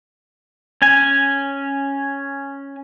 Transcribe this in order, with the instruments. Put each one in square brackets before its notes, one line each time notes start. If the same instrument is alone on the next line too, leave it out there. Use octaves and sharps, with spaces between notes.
[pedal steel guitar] C#4 G#5